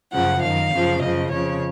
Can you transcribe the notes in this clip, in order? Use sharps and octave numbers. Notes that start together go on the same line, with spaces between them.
F#2 C#3 F3 F#5
F#2 D#3 F5
F#2 C#3 F3
F#2 C#3 F3 D#5
F2 C#3 F3 C#5